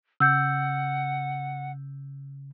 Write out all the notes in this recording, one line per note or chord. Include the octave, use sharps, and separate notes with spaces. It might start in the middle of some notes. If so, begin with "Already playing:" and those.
C#3 F#5 E6 G6